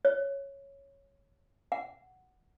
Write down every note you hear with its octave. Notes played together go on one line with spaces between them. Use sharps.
C#5
F#5